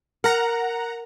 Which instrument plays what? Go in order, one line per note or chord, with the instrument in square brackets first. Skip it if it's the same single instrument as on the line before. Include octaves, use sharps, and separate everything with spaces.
[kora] A#4 [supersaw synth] F#5 A#5